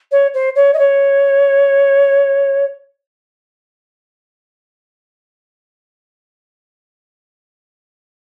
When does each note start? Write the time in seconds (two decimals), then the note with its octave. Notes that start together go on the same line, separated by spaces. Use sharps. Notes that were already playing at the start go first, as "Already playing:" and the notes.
0.12 C#5
0.34 C5
0.56 C#5
0.74 D#5
0.79 C#5